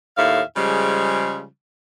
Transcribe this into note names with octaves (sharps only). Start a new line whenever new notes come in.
D#2 A2 E5 F5
C#3 F3 G3 G#3